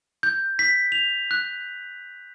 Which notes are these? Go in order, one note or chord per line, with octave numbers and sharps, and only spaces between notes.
G6
B6
F7
F#6